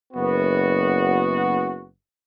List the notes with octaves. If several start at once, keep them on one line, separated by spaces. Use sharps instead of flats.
F#1 B3 F#4